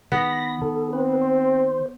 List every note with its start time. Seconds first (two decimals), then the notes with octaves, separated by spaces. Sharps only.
0.12 D#3 B3 B5 A#6
0.61 D#3 A4
0.93 C4 B4
1.21 C5